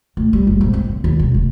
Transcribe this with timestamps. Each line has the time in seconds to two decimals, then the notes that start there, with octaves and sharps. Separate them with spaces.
0.17 D2
0.33 G3
0.47 F#1
0.61 G#2
0.74 C4
0.89 D3
1.04 D#2
1.19 E1
1.34 F1